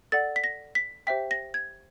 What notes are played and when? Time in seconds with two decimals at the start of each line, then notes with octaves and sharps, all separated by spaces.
0.12 A4 D5 F#5 A6
0.36 B6
0.44 A#6
0.75 B6
1.07 G4 C5 E5 G5 B6
1.31 A#6
1.54 G#6